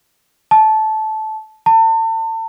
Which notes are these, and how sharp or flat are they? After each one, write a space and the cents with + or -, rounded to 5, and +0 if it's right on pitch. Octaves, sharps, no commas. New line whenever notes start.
A5 -15
A5 +35